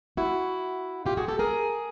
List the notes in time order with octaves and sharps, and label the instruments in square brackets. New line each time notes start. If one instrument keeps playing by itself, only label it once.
[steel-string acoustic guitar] E4 F#4
F4 G4
F#4 G#4
G4 A4
G#4 A#4